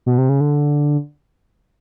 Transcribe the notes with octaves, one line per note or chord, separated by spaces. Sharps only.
B2
C3
C#3
D3